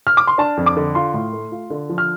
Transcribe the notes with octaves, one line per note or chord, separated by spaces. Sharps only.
F6
D6
C6
D4 A5
F2
D6
D3
F4 C6
A2
A3
F4
D3
F3
F6